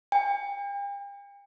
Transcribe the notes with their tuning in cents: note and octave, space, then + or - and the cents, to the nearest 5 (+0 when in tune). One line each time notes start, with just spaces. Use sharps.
G5 +45